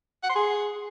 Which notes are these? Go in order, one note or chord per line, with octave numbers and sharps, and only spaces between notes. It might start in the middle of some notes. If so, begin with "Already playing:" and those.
F#5
C6
G#4